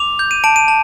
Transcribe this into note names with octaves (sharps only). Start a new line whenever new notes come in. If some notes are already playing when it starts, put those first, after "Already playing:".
Already playing: D6 F7
G6
D#7
A5 D7
D#7
A5